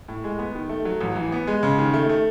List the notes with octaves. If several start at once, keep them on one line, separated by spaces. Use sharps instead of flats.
A2
G#3
B3
D#3
A3
F#3
A1
E3
B3
G#3
C#3
D#3
A3
A3